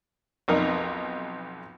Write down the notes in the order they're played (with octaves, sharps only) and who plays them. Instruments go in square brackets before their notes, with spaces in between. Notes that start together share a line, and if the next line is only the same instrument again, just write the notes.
[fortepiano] B1 F2 D#4 A#4